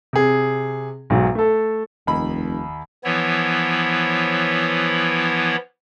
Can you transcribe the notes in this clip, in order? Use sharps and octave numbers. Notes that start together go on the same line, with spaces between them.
C3 G#4
B1 G#2 F#3
A3 A4
F1 D#2 D#5 B5
E3 F3 B3 E4 C#5